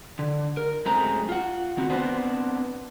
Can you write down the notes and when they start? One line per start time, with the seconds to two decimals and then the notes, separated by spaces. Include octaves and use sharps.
0.19 D3
0.57 A#4
0.85 F#2 G#3 A3 C4 G#4 A#5
1.29 F4 F#5
1.77 D#3 C4 F#4
1.90 B3 C4 D4 B4 C5 F#5